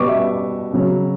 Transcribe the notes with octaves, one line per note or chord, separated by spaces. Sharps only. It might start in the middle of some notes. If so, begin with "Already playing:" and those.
Already playing: B2 G3 B3 C#6 D6
E5
C#3 F#3 C#4